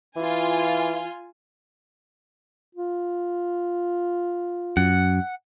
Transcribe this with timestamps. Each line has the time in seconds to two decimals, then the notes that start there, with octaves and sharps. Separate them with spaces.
0.17 E3 F4 G#5
2.75 F4
4.77 F#2 F#5